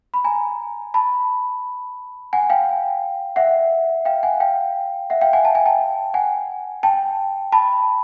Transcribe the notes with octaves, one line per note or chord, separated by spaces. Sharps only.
B5
G#5 A#5
A5 B5
F#5 G#5
F5 G5
E5 F#5
F5 G5
F#5 G#5
F5 G5
E5 F#5
F5 G5
F#5 G#5
A5
G#5
G5 A5
F#5 G#5
G5 A5
A5 B5